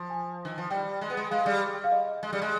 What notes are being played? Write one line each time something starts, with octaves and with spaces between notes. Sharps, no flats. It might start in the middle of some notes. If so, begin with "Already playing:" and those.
Already playing: F3
G#5
D#3
F3
G3 G5
G#3
B3
G#3
G#3 F5
G3
F5
D#5
G#3
G3
G#3